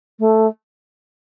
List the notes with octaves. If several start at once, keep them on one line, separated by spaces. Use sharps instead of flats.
A3